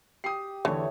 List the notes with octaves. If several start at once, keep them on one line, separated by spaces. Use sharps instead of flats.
G4 D#6 C7
E2 D3 E3 A3 C#5